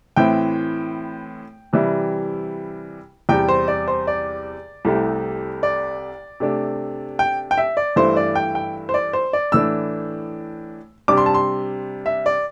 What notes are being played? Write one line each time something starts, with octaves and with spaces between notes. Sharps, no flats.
A2 E3 C4 E4 G5
C3 E3 G3 E4
E2 C3 G3 G5
C5
D5
C5
D5
C2 C3 A3 E4
D5
C3 A3 D4
G5
G5
E5
D5
G2 E3 A3 E4 C5
D5
G5
G5
C5
D5
C5
D5
A2 E3 A3 D4 E6
C3 G3 D4 D6
C6
A5
C6
E5
D5